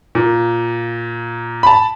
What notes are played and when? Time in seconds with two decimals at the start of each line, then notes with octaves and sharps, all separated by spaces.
0.15 A#2
1.63 A5 B5